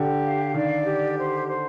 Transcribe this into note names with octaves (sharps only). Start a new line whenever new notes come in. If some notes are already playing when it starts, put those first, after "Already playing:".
Already playing: D3 G4
F5
D#3 D5
G4
C5
C5